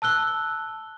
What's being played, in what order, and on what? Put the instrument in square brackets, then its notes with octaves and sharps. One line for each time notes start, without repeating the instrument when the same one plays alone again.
[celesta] A5 E6 F#6 G7